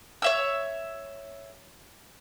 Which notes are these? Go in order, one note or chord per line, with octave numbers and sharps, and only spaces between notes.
C#5 E5 E6